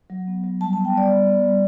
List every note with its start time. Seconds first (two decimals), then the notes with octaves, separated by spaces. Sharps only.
0.10 F#3
0.27 B3
0.44 F#3
0.61 G3 A5
0.73 B3 A5
0.85 G5
0.94 G3 D5
1.10 G3
1.26 B3
1.44 G3